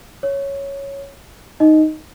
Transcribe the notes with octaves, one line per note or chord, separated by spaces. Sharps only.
C#5
D#4 D#5